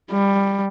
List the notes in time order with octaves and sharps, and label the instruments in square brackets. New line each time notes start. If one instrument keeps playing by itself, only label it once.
[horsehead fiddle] G3